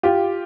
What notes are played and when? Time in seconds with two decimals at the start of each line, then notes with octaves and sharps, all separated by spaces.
0.03 F4 G4